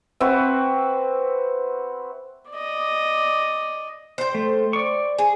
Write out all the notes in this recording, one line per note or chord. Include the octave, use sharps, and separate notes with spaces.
C4 F#4 B4 E5
D5 D#5
C5 G5
A3
D5 C#6
G#4